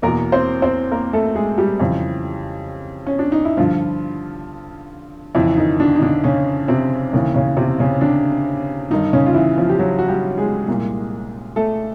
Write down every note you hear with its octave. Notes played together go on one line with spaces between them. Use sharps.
E2 B2 A#3 A#4
C4 C5
C4 C5
A#3 A#4
A3 A4
G#3 G#4
G3 G4
F2 C#3 E3
C#4
D4
D#4
E4
G2 D3 F3 F4
F2 C#3 E3 E4
D#3 D#4
D3 D4
D#4
D3 D4
C#3 C#4
C3 C4
D#2 C#3 E3
C#3 C#4
C3 C4
C#3 C#4
D3 D4
G2 D3 D#3 D#4
C#3 C#4
F4
E3 E4
F3 F4
G4
F#3 F#4
F#4
G3 G4
G#3 G#4
C2 A#2
A3 A4